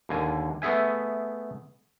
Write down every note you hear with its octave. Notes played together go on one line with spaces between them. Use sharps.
D#2 D3 G#5
A3 B3 G#4 E5 G#5